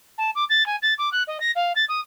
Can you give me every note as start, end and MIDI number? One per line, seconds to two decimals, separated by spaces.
0.18 0.31 81
0.35 0.44 86
0.49 0.66 93
0.66 0.76 80
0.82 0.94 93
0.98 1.10 86
1.12 1.23 90
1.27 1.38 75
1.40 1.51 94
1.56 1.73 77
1.76 1.85 93
1.89 2.01 87